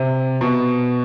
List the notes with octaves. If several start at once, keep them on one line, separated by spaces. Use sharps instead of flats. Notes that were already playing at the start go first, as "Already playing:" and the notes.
Already playing: C3
B2